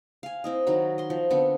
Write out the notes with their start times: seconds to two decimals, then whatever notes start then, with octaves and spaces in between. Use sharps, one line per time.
0.23 F5 G#5
0.44 C4 E4 D#5
0.67 D#3 F#3 F#4 B5
0.98 D#5 C6
1.10 F3
1.30 D3 B3 C4 D4